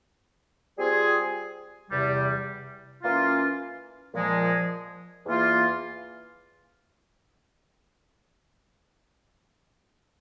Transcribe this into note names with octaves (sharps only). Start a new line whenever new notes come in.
G3 C4 F4 G#4
E2 C3 G3
E3 A#3 C#4 F4
A#2 F3 G#3
E2 E3 A#3 F4